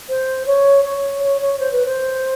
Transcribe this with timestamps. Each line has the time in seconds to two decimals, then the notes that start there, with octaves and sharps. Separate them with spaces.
0.09 C5
0.46 C#5
0.84 C#5
1.22 C#5
1.41 C#5
1.59 C5
1.71 B4
1.85 C5